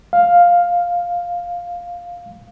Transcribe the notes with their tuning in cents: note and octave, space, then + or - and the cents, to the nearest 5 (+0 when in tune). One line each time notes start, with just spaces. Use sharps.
F5 +5